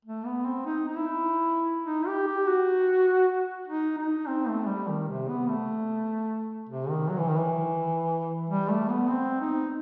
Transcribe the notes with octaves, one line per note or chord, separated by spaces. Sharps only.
A3
B3
C4
D#4
D#4
E4
D#4
G4
G4
F#4
D#4
D#4
C4
A3
G3
D#3
C3
B3
A3
C3
D#3
F#3
E3
D#3
E3
G3
A3
B3
C4
D#4